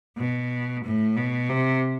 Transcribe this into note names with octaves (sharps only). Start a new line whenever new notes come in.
B2
A2
B2
C3